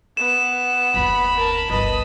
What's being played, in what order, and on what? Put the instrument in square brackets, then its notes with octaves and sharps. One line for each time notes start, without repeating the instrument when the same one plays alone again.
[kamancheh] B3 F#5 [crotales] E7
[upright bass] F#1 D#2 [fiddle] B5
[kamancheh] A#4 A5
[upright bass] G1 C#2 [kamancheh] B4 D#5 [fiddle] A5 B5